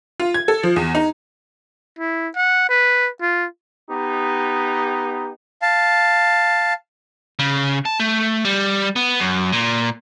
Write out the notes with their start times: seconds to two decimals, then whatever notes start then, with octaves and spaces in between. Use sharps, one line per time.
0.20 F4
0.34 G#6
0.48 A4
0.63 F3
0.76 E2
0.95 D#4
1.99 E4
2.35 F#5
2.69 B4
3.21 F4
3.89 B3 D#4 G4
5.62 F5 A5
7.39 C#3
7.86 A5
8.00 A3
8.45 G3
8.96 B3
9.20 F#2
9.53 A#2